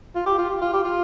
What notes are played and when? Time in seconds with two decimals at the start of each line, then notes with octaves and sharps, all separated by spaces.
0.15 F4
0.26 G4
0.38 F4
0.50 G4
0.61 F4
0.73 G4
0.84 F4